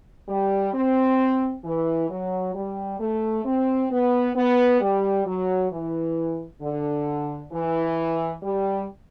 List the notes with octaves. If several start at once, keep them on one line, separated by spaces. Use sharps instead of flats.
G3
C4
E3
F#3
G3
A3
C4
B3
B3
G3
F#3
E3
D3
E3
G3